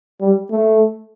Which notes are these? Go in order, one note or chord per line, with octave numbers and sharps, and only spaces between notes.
G3
A3